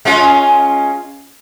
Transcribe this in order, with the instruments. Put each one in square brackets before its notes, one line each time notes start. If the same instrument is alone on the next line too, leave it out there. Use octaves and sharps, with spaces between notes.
[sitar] G#3 C#4 F4